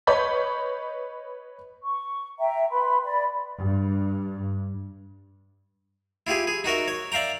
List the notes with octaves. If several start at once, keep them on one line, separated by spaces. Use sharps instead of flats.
B4 C#5 D#5 B5 G6 B6
C#6
E5 G5 A#5
B4 B5 C6
D5 B5
G2
E4 F4 G4 G#4
G#4
D#4 F#4 A#4 E5
C#5
D5 E5 F5 G5 A#5